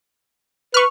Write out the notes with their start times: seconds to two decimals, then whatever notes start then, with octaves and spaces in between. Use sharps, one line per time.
0.74 B4 C#6 F6